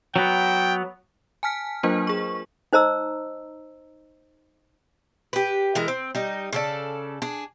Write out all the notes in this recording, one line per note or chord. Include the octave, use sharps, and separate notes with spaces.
F#3 B3 G5
G#5 A5 F6 B6
F#3 A#3 D4 F4 A#4 C5
G#4 C#6
D#4 C5 D#5 A#5 E6
G4 B4
E3 G#3 A#4
C4
G3 D#4
C#3 A4 D5
D4 G#4